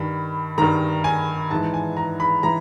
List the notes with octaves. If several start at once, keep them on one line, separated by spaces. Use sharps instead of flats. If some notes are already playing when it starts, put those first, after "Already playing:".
Already playing: G2 D#3 B5
G2 D#3 A#5
G#5
G#2 E3 A5
G#5
A#5
B5
E3 A#5